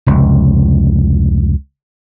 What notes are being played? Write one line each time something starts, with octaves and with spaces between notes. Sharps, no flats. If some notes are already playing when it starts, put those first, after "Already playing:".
F1 C#2